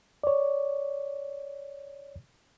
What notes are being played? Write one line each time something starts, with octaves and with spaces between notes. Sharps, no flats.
C#5 D5